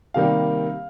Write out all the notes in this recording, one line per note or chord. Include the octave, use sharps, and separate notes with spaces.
C3 D#3 G3 A#3 F5